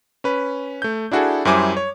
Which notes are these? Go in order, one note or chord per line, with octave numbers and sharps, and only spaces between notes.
C#4 B4
A3 G6
D4 E4 F#4 G#4 A4
F#2 G3 E4 C5 G#5 D6
C#5